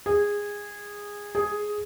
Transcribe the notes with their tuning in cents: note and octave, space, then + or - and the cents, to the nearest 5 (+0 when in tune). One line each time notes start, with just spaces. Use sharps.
G#4 -15
G#4 +5